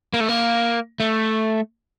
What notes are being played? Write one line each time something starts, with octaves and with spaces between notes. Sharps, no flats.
A#3
A3
A#3
A3